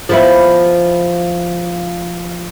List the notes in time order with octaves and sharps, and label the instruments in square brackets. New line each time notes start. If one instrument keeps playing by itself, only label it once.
[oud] F3 B3 E4